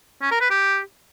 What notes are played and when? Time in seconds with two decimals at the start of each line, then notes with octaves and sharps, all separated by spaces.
0.22 C#4
0.31 A#4
0.41 B4
0.50 G4